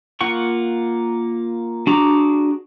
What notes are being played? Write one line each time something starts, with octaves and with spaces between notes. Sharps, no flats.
A#3 F4 F#5 C#6
D4 F#4 G#4 A#5 D6